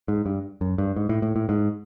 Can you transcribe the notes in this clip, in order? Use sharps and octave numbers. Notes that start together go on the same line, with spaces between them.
G#2
G2
F#2
G2
G#2
A2
A2
A2
G#2